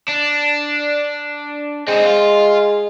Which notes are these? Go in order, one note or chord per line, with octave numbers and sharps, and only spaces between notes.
D4
G#3 C4 D#4
F4